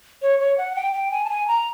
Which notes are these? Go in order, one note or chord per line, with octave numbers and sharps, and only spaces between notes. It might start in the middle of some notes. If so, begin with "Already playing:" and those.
C#5
C#5
F#5
G5
G5
G#5
A5
G#5
A#5